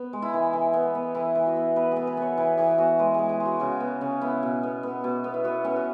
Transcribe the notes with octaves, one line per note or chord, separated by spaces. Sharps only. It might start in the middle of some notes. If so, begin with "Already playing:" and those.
Already playing: B3
G#3
E4
E3
E3
B3
B3
E3 E4
E3
F#4
B3
B3 B4
B3 G#4
B4
B3 C#5
E3 B4
E3 G#4
B3 F#4
G#3 B4
G#3 G#4
G#4
G#3
F#4
C#3 F#4
B3
C#3 C#4
B3 E4
B2
B3
B3
B2
B3
E4
B3 F#4
B3 C#4
F#4